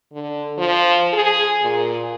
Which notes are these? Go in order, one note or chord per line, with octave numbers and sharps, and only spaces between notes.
D3
F3
G#4
A#2